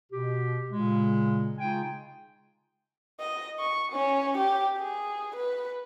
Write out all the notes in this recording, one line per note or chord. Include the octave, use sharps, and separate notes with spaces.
B2 G4
A#2 C#3 G#3
C#3 G#3 D#4 F4 G5 G#5
D#5
C#6
C#4
G4
G#4
B4